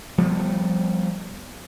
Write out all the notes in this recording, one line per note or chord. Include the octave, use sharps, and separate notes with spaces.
F3 G3 A3 B3